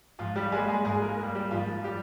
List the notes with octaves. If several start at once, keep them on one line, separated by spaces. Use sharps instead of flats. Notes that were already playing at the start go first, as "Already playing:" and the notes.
G#2 F3 F4
G3 G4
G3 G#3 A#3 G#4
G#3 G#4
G#2 G#3 G#4
A#3 A#4
G3 A#3
G3 G4
G#2 F3 F4
G3 G4